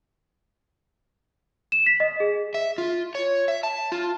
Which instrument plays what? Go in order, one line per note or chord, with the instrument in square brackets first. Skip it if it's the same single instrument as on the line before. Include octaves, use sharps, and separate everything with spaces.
[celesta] E7
B6
D#5
G#4
[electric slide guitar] E5
F4
C#5
E5
A5
F4